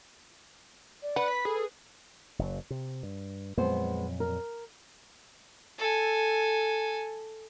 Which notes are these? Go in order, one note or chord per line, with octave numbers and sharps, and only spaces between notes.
D5
B4 F#5
B6
G#4 A4
F#1 C3 F#3
C3
G2
F2 A#2 F#3 G#3 B3 C5
A#4
A4 G#5